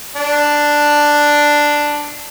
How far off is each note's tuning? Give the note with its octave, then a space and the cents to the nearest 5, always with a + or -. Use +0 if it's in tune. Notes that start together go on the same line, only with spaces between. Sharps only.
D4 +5